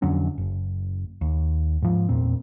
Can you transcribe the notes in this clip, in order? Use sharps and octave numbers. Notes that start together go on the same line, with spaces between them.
F2 D3 F#3 C#4
F#1
D#2
G#2 F3
E2 A#2 C4